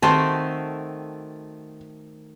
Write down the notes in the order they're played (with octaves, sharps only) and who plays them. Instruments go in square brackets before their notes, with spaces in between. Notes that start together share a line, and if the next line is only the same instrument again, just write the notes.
[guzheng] D#3 A3 F#4 [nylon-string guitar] C4 [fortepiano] A5 C6